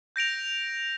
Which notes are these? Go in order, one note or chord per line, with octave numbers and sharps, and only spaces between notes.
G6 A#6 D7 F7